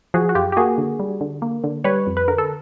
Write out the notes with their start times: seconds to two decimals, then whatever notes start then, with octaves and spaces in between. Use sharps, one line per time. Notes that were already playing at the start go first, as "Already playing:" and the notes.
0.14 F3 F#4 G#4
0.29 F#4
0.35 F#2 F4 G4
0.52 G4
0.57 A#3 F#4 G#4
0.78 D3
1.00 G3
1.21 D3
1.42 A#3
1.64 D3
1.84 G3 B4 C#5
2.07 F2
2.17 B4
2.28 D3 A#4
2.38 A4